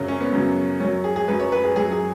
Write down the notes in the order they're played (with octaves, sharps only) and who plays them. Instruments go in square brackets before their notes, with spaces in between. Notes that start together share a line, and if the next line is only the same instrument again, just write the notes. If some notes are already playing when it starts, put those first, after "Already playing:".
Already playing: [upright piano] F#2 C#3 F#3
C#4
B3
F#2 C#3 F#3
F#2 C#4
F#3
G#4
G#4
F#2 F#3 B4
C#5
B4
G#4
F#2 F#3 G#4
G#4